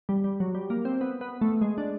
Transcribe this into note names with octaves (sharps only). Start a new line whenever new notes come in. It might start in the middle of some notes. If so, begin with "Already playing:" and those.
G3
G3
F#3
G3
A#3
C4
B3
B3
A3
G#3
D4